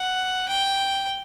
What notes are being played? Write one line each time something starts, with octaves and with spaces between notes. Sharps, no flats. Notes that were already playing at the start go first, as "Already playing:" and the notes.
Already playing: F#5
G5